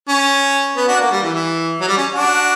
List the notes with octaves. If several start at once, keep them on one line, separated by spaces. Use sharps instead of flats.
C#4
B3
D4 F#4
A#3
G3
E3
E3
F#3
G3
C#4
D4 F#4